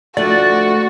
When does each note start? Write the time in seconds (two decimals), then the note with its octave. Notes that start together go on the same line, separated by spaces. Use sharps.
0.17 D2 F3 A3 F#4 D5